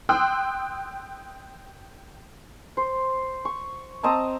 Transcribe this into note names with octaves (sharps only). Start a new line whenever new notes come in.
G5 C6 D#6 E6 F#6
C5
C#6
C4 D#5 A5 A#5